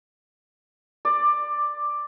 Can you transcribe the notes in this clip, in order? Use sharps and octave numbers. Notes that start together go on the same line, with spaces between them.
D5